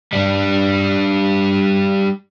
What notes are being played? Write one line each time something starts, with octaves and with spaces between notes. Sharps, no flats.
G3 D4